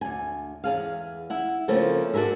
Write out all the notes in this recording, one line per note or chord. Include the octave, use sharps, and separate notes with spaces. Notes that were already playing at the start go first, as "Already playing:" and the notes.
D2 G#5
E2 A#2 G#4 F5
E4 F#5
C#3 F3 A3 A#3 C4 C#4
D4 F#4 G#4 A#4 E5